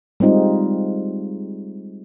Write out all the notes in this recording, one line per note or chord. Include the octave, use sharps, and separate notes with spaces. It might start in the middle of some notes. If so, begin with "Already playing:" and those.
G3 G#3 C4 D#4 F4